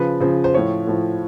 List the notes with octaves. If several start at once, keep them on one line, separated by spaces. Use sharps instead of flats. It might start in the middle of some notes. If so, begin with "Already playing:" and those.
Already playing: C#3 F3 B4
C#3 F3 C5
C5
A2 F3 C#5
A2 F3